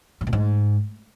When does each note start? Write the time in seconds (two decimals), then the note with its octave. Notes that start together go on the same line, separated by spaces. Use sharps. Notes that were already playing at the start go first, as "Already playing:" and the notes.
0.21 G#2
0.27 B2
0.33 G#2